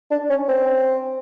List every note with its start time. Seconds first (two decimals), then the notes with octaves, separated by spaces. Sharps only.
0.11 D4
0.30 C#4
0.48 C4